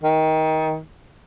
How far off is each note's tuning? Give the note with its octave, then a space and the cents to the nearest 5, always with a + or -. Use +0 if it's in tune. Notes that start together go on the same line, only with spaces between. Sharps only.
D#3 +20